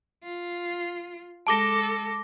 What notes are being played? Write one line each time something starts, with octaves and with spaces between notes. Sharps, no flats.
F4
G#3 A4 A5 D6 A#6